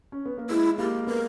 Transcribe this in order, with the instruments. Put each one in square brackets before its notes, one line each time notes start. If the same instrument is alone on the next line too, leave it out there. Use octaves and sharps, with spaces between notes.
[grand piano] C#4
B3
A#3
[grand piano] G#3 [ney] E4
[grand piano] A#3 [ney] G4
[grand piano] B3 [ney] A#4